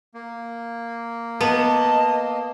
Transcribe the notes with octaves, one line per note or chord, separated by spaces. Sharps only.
A#3
B3 D#5 A5